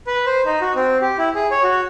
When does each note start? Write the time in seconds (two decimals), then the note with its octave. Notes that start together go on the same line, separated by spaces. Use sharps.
0.07 B4
0.26 C5
0.46 D#4
0.61 F#4
0.75 C4
1.01 G4
1.18 E4
1.35 G#4
1.51 C#5
1.63 F#4